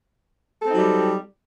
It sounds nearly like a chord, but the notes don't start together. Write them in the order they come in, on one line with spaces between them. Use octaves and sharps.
A4 C4 D#4 F#3 G3